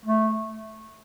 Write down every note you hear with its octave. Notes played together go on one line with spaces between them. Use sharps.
A3